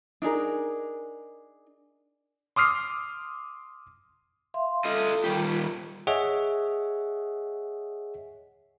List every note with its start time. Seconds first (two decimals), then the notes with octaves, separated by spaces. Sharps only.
0.22 D4 D#4 G#4 A#4
2.56 C6 D6 D#6 F6 C7
4.54 E5 F5 C6
4.85 F4 A4 D#5
5.24 D#3 G3 F4 G4
6.07 G#4 C#5 D#5 E5 F#5